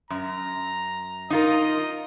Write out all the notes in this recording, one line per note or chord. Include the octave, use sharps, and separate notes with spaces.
F#2 A#5
D#4 F4 A#4 D#5